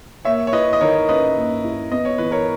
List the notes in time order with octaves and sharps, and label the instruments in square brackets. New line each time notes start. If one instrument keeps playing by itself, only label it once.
[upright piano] A#3 [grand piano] C#5 E5
[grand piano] C#5
[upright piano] E4 [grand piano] B4 D#5
[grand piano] D#5
[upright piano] D#3 [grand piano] A#4 C#5
[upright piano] C#4 [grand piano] B4 D#5
[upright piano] A#3
E4
[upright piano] B3 [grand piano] D#5
[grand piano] C#5
[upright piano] E3 [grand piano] B4
[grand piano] A#4 C#5